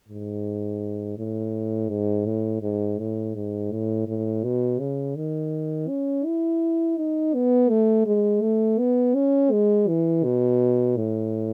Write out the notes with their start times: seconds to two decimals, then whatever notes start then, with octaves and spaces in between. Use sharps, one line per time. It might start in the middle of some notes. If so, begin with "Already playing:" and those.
0.08 G#2
1.18 A2
1.89 G#2
2.26 A2
2.62 G#2
2.99 A2
3.35 G#2
3.72 A2
4.07 A2
4.44 B2
4.79 C#3
5.16 D#3
5.89 C#4
6.25 E4
6.98 D#4
7.34 B3
7.70 A3
8.06 G#3
8.42 A3
8.79 B3
9.15 C#4
9.52 G#3
9.88 E3
10.24 B2
10.97 A2